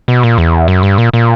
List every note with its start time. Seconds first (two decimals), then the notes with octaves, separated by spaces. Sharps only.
0.08 B2
0.23 A#2
0.38 E2
0.68 F#2
0.83 G2
0.98 A#2
1.13 A#2